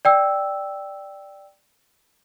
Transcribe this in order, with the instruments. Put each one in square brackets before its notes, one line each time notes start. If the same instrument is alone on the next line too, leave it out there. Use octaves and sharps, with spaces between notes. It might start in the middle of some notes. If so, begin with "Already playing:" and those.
[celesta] D5 G5 E6